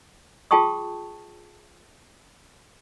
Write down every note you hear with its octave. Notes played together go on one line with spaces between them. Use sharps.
F4 G#4 G5 A5 C#6 D#6